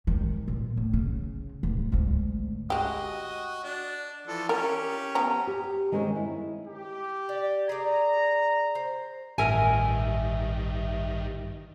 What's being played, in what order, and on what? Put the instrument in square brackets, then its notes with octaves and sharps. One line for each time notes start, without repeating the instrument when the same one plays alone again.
[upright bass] G#1 D#3
A#2
A2
C#3
D1
G#1 D2
[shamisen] G#3 G4 [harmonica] F#4 D#5
[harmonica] D4
E3 F3 A4
[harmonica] C#4 G4 [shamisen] A#4
[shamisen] F3 B3 A#5
[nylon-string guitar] G4
D#3 G#3 C4 C5 C#5
E4
[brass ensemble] G4
[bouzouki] D5
[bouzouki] G#4 A#4 D5 [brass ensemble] A#5
[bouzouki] C5
[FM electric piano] A1 E5 [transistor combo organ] G2 D#3 [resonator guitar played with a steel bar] A#4 G#5